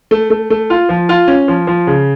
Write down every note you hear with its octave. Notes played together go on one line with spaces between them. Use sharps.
A3
A3
A3
F4
F3
F4
C#4
F3
F3
C#3